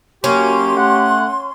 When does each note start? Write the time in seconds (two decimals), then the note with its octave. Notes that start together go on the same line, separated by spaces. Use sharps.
0.24 F#2 A#3 C#4 G4 C6
0.76 A3 F#5